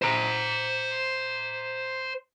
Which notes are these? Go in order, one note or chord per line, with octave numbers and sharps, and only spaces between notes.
C5 A#5